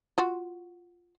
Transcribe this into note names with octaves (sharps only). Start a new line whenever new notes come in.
F4 F#4